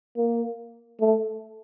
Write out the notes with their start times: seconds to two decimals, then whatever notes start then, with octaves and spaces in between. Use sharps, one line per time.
0.17 A#3
1.00 A3